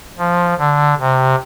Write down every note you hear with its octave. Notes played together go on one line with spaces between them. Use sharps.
F3
D3
C3